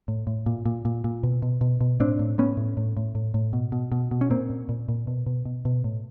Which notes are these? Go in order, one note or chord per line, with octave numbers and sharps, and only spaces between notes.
A2
A2
A#2
A#2
A#2
A#2
B2
B2
B2
B2
A2 C4 D4
A2
A2 B3 C#4
A2
A2
A2
A2
A2
B2
B2
B2
B2
C#4
A#2 A#3 C4
A#2
A#2
A#2
B2
B2
B2
B2
A2